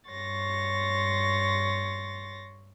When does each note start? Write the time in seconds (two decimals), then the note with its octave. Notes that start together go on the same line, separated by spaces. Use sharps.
0.10 G2 C#5 C6 C#6 A6 A#6